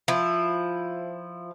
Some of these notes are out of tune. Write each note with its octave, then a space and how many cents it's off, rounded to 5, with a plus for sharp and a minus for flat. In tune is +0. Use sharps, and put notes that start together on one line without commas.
F3 +0 E4 +5